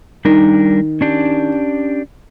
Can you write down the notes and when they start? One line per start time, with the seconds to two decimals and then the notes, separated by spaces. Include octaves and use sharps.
0.25 D#3 G3 D4 A#4
1.01 C#4 D4 G4